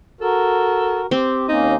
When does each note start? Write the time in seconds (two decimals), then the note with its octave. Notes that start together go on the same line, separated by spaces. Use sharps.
0.21 F#4 A4 A#4
1.11 C4 G4
1.49 D#2 A#3 C#4 D#4